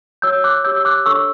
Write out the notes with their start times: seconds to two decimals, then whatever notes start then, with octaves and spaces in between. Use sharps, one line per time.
0.22 F#4 C#5 E6 G6
0.44 D6 F#6
0.64 G4 C#5 E6 G6
0.76 E6
0.85 D6 F#6
1.05 D4 A4 C#5 C#6 E6